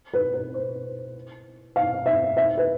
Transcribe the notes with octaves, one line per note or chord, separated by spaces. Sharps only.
B4
B4
C5
F5
E5
E5
B4